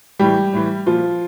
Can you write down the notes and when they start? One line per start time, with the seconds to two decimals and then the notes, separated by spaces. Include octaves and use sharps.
0.19 A2 E3 G3 G4
0.53 A2 E3
0.86 A#2 F3 F4